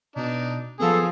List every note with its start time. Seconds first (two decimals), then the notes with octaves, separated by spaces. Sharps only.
0.16 B2 D4 D#4
0.80 F3 B3 G#4 A4